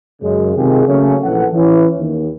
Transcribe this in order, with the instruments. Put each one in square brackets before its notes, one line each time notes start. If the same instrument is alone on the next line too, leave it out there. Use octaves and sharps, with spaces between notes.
[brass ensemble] F#2 C#3 G#3
C3 D#3 G#3 F4 G4 G#4
C#3 F#3 A3 A#3 C#4
A#1 E3 A4 F#5
E3 C#4 E4
D#2